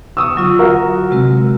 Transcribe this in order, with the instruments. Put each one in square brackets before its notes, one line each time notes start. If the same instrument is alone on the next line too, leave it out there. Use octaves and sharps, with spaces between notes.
[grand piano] C#6 D#6 E6
[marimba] D3 F#3 F4
[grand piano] F#4 A#4
[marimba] C3 G#3 C4